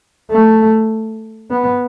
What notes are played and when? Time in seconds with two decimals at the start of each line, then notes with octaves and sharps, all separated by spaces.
0.31 A3
1.51 B3